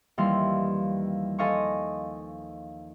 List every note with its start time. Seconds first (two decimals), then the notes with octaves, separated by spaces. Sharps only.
0.18 D#2 E3 F3 G3 F5 C6
1.38 A4 C5 D#5 F5 G#5 C#6